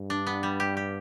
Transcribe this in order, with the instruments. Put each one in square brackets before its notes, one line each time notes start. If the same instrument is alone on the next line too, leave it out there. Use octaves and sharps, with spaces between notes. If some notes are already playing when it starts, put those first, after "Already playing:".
Already playing: [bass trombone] G2
[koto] D4
B3
G3
G4
G4